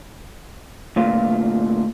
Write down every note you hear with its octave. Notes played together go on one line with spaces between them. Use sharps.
D2 A#2 F4